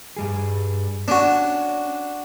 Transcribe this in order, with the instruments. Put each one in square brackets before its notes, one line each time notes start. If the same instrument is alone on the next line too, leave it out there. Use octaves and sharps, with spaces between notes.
[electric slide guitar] G2 G3 G#4
[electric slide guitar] C#4 C#5 D5 [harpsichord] D4 F#4